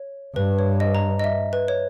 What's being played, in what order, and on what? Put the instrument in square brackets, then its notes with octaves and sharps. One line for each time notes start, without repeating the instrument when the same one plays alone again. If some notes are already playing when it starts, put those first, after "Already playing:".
Already playing: [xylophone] C#5
[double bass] G2 [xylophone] B4
[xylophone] C#5
D#5
A#5
D#5
E5
B4
C#5